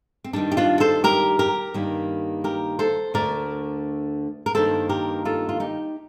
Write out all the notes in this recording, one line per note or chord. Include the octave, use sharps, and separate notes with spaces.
C4
G2 D#3 G3 D4
G4
D4 F4
A4 C5
G4 A#4
G4 A#4
G2 D#3 G3 A#3
G4 A#4
A4 C5
D2 D3 A3 A#4 D5
A#4
G2 D#3 A#3 A4 C5
G4 A#4
F4 A4
F4
D#4 G4